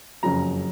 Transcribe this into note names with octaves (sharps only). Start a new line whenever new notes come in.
F#1 F2 C#3 F#3 A#5